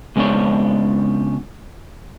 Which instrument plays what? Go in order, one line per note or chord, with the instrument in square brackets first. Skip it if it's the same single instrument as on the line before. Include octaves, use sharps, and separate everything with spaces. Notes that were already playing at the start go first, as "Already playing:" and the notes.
[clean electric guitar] C#2 G#3 B3 C4 D4 C#5